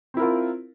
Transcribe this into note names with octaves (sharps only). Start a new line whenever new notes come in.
C4 E4 F4 A#4